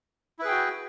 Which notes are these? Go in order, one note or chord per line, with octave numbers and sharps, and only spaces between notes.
E4 F#4 G#4 B4 G5